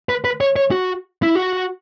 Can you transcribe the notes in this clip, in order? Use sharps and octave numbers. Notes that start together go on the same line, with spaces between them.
B4
B4
C#5
C#5
F#4
E4
F#4